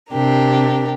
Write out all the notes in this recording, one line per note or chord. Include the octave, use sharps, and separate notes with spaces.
C3 D4 G4 A#4